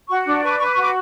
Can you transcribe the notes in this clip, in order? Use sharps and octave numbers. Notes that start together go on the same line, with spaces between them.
F#4 C#6
D4 D6
B4 C#6
D6
B4 C#6
D6
F#4 C#6
D6